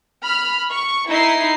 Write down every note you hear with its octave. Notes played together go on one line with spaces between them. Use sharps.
B5 F6
C#6
D#4 E4 C7